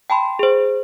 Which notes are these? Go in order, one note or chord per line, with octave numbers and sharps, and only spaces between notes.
G5 A5 B5 C6
G#4 C5